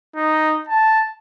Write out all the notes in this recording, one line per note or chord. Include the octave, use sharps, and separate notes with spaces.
D#4
A5